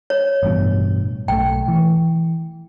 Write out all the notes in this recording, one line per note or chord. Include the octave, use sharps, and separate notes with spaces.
C#5
A1 G2 B2
B1 A3 G5
E3